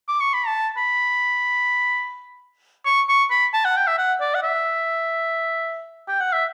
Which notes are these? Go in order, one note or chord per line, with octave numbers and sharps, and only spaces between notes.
D6
C#6
B5
A5
B5
C#6
C#6
B5
A5
F#5
G5
E5
F#5
D5
F#5
E5
G5
F#5
E5